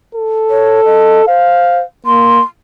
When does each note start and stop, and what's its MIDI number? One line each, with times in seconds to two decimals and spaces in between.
0.15 1.25 69
0.50 0.84 73
0.85 1.22 75
1.27 1.81 72
1.27 1.83 77
2.06 2.41 58
2.06 2.41 84